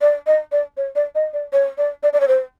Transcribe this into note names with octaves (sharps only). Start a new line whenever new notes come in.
D5
D#5
D5
C#5
D5
D#5
D5
C#5
D5
D5
D5
C#5
C5